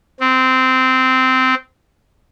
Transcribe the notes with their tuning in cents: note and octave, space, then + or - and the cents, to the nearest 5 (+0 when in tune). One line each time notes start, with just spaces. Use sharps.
C4 -15